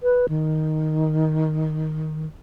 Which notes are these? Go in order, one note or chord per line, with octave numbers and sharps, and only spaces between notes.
B4
D#3